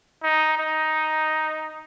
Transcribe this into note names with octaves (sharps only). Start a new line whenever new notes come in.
D#4
D#4